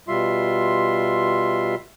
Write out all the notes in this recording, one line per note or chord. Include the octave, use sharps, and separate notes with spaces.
B2 G3 F4 E5 C6